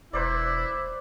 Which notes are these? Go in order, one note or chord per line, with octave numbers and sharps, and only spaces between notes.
E1 E4 B4 C5 D5